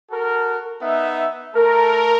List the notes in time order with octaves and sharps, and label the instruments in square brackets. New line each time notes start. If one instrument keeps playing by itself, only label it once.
[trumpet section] F#4 A4 A#4
B3 D#4 E5
[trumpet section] A3 A4 A#5 [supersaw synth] A#4